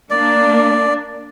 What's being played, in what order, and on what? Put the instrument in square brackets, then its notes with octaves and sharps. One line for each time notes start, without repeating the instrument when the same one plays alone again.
[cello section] A#3 D4 [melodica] D5